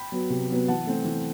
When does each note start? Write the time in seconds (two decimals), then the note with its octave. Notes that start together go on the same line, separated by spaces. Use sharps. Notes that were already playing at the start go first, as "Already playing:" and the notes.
Already playing: G5 B5
0.12 F#3 B3
0.30 C3
0.50 F#3 B3
0.68 E3 F#5 A5
0.87 A3 C4
1.05 E3